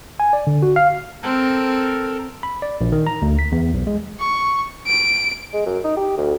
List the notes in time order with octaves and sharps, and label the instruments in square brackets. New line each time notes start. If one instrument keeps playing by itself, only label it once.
[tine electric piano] G#5
D5
D3
F#4
F5
[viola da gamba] C4 [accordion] A4 A#4
[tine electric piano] B5
D5
A#1
D#3
A#5
D2
B6
E2
B1
G#3
[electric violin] C#6
D7
[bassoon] G#3
F#2
D#4
G4
D2